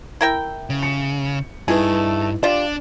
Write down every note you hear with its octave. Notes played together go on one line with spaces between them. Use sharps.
E4 A#4 G5
C#3
C#7
G2 A3 D#4 E4 G#4 B4
D4 F4 G4 D5